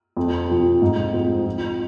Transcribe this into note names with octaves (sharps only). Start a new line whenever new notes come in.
F2
C3 F3 C4
G#2
F3 G#3 C4
F3